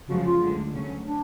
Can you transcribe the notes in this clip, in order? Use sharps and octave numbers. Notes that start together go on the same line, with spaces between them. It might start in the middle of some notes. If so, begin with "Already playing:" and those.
F#2 C#3 F3 G#3 F#4
F4
D2 D3 G#3
D2 C#3 F#3 C#4
D4